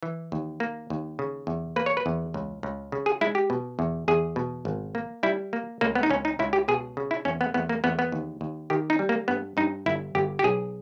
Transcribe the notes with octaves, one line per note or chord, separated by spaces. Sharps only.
E3
D#2
A#3
D#2
C#3
E2
A#3 B4
C#5
B4
E2
C#2
C#2
C#3
G#4
G#3 E4
G4
B2
E2
E2 G#4
B2
G#1
A#3
G3 E4
A#3
C#2 A#3
B3
D#4
C#2 C#4
D#4
C#2 E4
G4
B2 G#4
C#3
E4
E2 C#4
B3
E2 B3
A#3
E2 B3
B3
D#2
D#2
D#3 G4
D#4
G3
A#3
G2 B3
G2 D#4
G1 E4
G1 G4
G4
B1 G#4